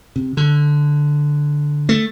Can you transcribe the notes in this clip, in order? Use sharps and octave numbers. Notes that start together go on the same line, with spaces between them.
C3
D3
A3